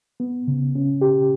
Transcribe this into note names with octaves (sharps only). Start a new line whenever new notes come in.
B3
C#3
C#4
G4